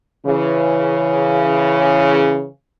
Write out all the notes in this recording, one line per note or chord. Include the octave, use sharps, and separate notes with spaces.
C#3 E3